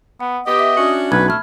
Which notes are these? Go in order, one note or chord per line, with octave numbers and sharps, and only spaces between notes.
B3 F#5
B3 G4 D#5
E5
C#4 D4 F#4
B1 B4 G#6
A3 B5 F6